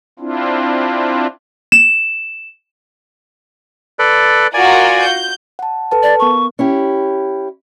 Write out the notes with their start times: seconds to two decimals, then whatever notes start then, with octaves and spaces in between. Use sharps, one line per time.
0.19 C4 D4 E4 F4
1.72 E7
3.99 A4 B4 D5
4.54 F4 F#4 A#4 D5 G#5
5.02 G6
5.59 F#5 A5
5.91 A4 B4 A5
6.03 D5
6.20 B3 A#4 C#6
6.59 C#4 E4 G4